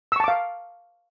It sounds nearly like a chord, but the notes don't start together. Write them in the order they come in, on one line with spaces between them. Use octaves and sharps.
E6 C#6 A5 D6 F5